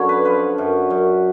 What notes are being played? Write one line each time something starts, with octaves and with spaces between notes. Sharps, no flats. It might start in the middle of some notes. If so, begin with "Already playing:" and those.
Already playing: F#2 D3 C#5
B4
F3 B4
F#2
F#2